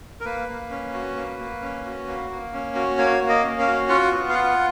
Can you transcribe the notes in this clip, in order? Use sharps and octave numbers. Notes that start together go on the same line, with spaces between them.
A#4
A#3 B4
A#3
C#4
F#4
A#3
A#3
C#4
F#4
A#3
A#3
C#4
F#4
A#3 C#5
A#3
D#5
C#4
F5
F#4
F4 F#5
B3
F5
F4 F#5